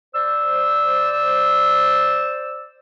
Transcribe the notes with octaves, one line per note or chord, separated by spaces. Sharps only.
C5 D5 E6